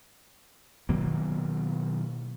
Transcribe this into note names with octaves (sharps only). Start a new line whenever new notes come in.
B2 D#3 F#3 A#3